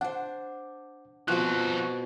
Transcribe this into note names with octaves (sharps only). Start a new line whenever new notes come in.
D4 C5 F#5
B2 F3 C4 F4 F#4 F#6